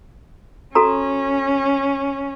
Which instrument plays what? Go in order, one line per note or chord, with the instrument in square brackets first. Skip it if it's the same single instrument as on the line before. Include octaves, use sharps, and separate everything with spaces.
[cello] C#4 [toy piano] F#4 A4 A#5